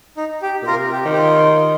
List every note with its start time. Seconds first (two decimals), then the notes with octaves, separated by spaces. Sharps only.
0.17 D#4
0.42 G4
0.62 A#2
0.67 C3 F4 A#4
0.92 G4
1.05 D#3
1.12 G4
1.17 F4